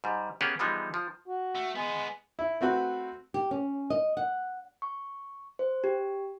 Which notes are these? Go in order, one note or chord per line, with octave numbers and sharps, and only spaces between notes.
G#2 G3
A#3 B3 C#4 G4 G#4 F#5
E3 F3 G3 G#3 B3 D#4
F3
F#4
A3
G#3 B3 G#4
E4
A3 C4 F#4 B4
G4
C#4
D#5
F#5
C#6
C5
G4